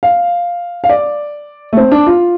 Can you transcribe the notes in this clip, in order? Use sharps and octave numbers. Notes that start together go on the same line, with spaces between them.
F5
F5
D5
A3
C4
D4
F4